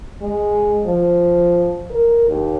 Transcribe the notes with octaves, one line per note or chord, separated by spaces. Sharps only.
G#3
F3
A#4
D#2